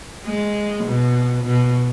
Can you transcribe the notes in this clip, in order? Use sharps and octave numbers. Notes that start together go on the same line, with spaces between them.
G#3
B2
B2